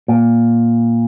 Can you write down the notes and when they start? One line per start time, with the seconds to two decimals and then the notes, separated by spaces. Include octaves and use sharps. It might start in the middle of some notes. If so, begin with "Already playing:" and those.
0.08 A#2